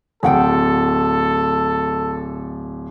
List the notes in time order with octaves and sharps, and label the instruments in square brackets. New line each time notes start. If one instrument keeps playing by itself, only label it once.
[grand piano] D1 [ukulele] G#4 F#5 G5 [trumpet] A4